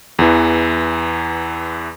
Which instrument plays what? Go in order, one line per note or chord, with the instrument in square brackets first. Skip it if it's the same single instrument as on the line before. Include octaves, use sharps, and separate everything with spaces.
[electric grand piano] E2 E3